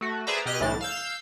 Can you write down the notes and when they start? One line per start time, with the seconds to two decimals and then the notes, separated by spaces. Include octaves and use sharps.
0.01 A3 F#4
0.27 G#4 B4 C5 D5 E5 A#5
0.46 B2 G4 D#5 F6 F#6 G#6
0.60 C2 A2 E3 D4 A6
0.81 F5 E6 G6